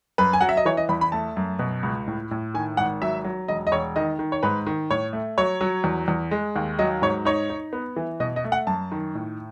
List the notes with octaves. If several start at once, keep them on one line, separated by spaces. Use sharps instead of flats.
F#2 B4
G#5
F#3 F#5
E5
D#5
E3 C#5
D#5
E2 B5
B5
A3 A5
F#2
B2
C#2
A2
A2
D#3 G#5
G#1 F#5
F#3 E5
F#3
E1 D#5
D#5
E1 C#5
D#3 D#5
D#3
C#5
G#2 B4
D#3
A2 C#5
A3
F#3 C#5
F#3
E2
E2
G#3
D#2
F#3 D#5
G#2 C#5
D#4 C#5
D#4
B3
E3
B2 D#5
D#5
A3
F#5
F#2 A5
D#3
A2